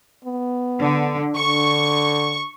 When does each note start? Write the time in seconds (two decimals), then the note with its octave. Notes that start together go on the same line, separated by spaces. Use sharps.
0.25 B3
0.80 D3
1.36 D3 C#6